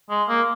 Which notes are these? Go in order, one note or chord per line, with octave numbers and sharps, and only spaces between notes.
G#3
A#3